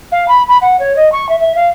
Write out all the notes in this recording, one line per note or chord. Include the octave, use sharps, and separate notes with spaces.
F5
B5
B5
F#5
C#5
D#5
C#6
E5
E5
F5